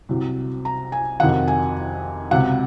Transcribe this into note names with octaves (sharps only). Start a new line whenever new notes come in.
C2 C3 F#3
A#5
G#5
F2 C3 D#3 F#3 F#5
G#5
C#2 C3 F#3 F#5